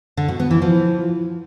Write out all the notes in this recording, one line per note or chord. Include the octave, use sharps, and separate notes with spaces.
D3
B2
B3
E3
F3